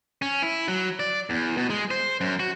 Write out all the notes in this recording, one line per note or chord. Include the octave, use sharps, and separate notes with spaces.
C#4
E4
F#3
D5
E2
B2
G#3
C5
F#2
F#4